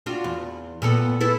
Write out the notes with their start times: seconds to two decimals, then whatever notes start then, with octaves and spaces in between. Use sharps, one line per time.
0.06 D4 F4 F#4
0.24 E2
0.82 A#2 B3 A4
1.21 E4 A4 B4